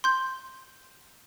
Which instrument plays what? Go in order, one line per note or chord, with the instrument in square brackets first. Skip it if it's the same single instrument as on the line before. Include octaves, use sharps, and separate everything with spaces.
[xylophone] C6 G6